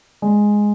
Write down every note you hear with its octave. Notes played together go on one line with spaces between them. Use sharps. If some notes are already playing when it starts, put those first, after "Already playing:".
G#3